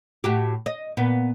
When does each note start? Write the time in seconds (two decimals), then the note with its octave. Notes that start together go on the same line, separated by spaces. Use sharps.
0.24 A2 F#4 G4
0.66 D#5
0.97 A#2 B3